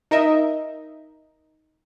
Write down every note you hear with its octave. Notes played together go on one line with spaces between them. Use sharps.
D#4 A#4 D#5 E5